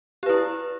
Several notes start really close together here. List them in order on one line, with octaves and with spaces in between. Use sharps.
G4 B4 E4